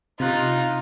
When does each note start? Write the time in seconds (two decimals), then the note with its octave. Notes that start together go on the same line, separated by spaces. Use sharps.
0.20 C3 D#4 F4 F#6